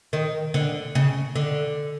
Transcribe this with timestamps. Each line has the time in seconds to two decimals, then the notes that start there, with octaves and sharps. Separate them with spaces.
0.13 D#3
0.54 D3
0.95 C#3
1.35 D3